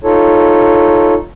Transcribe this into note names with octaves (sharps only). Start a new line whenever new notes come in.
D#4 F4 A4 C#5